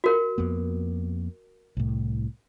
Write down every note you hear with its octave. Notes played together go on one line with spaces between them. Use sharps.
F#4 A#4
F2 A#3 B3
C2 A2